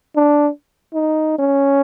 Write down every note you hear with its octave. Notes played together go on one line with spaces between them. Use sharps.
D4
D#4
C#4